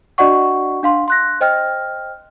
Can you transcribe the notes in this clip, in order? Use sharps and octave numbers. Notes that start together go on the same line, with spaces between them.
D4 F#4 D5 D#5 F#5 C#6
D4 F5 C6
C6 F#6 A#6
C5 D#5 G5 F6